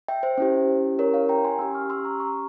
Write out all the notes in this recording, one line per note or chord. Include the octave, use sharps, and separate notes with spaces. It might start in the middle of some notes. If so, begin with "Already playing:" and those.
E5 G5
C5 E5
C#4 E4 G4
A#4 C#5
C#5 F5
G5 A#5
G#5 C6
C#4 G4 C6 E6
C#6 F6
C6 E6
A#5 C#6
A#5 C#6